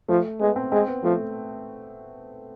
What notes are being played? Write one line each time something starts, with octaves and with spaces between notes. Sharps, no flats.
F3 A3
G#3 B3
C4
G#3 C4
B3
F3 A3